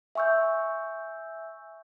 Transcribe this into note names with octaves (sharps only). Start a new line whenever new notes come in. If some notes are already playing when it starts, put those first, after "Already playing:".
E5 G#5 C#6 E6 G6